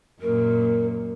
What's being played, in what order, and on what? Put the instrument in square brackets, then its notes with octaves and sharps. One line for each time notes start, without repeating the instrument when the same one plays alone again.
[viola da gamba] F#2 A#2 [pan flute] A#4